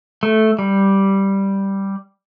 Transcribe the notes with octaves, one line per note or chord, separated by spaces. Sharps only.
A3
G3